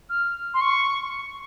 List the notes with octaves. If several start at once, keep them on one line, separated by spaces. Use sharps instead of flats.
F6
C6
C#6